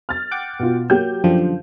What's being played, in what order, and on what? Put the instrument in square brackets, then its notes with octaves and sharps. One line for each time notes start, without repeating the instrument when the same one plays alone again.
[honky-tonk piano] F6 A6
[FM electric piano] F#5 G5 D6
[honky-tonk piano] B2 F4
[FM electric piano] F#3 [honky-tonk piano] A#3 G4 G6
[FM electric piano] F#2 D3 F3